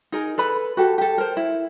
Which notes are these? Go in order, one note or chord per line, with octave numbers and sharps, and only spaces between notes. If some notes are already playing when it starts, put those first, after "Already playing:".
D#4 G#4 A#4
A4 B4 B5
F#4 G4 A4
G4 A4
A#4 C5
E4